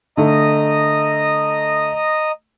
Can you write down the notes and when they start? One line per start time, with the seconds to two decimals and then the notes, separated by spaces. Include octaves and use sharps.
0.17 D3 A3 D#5 A#5 D#6